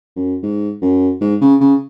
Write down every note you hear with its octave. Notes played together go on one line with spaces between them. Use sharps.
F#2
G#2
F#2
G#2
C#3
C#3